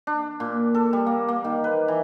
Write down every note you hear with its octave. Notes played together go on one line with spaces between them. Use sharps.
D4
A#2
A4
G3
A#3
A#3
D#3
B4
E3